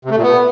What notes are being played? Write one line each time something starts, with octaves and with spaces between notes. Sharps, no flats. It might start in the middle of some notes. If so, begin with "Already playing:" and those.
C3
A3
A#2
B3